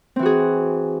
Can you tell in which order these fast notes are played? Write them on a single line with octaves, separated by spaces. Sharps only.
C4 E3 F#4 G#4